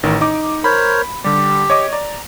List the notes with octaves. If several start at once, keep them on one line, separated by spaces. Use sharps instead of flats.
A1 D#3
D#4 D6
A#4 C5 C#5 B5
D3 G3 G4
C#5 D#5 D6
D5 A#5